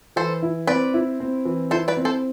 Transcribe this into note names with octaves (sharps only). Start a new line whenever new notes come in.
E3 A4 C5
E4
C4 B4 D5
E4
C4
E3
E4 A4 C5
B4 D5
C4
A4 C5